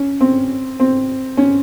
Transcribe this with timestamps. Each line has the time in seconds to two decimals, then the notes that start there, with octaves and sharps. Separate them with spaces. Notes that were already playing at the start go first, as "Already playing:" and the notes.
Already playing: C#4
0.21 C4
0.80 C4
1.37 C#4